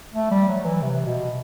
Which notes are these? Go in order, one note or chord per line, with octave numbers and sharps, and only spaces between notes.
A3
G3
F#3
E3
C3
B2